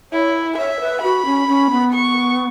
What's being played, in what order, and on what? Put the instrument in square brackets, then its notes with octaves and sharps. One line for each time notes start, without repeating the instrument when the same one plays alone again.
[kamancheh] E4 [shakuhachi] C#5
[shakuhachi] C#5 [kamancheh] E5
[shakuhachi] B4
[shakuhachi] F#4 [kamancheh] B5
[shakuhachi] C#4
C#4
B3
[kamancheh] C#6